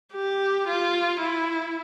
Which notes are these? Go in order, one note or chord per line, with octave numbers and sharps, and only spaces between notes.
G4
F4
E4